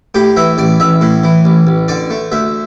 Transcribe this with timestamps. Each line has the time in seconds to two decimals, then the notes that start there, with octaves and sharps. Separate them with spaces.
0.15 A2 G4
0.36 E3 E5
0.58 A1 D5
0.80 A1 E5
1.01 A2
1.24 E3
1.45 A1
1.67 A1
1.88 D3 D5
2.10 A3
2.32 D2 E5